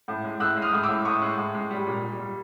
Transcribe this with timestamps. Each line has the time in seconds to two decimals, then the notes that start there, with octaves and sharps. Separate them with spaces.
0.08 A2
0.24 G#3
0.40 A2 E6 F#6
0.56 G#3
0.62 D#6 F6
0.73 A2
0.83 D6 E6
0.89 A2
1.05 A2 C#6 D#6
1.22 G#3
1.37 A2
1.54 G#3
1.70 G3
1.87 A#2
2.03 G3
2.19 G3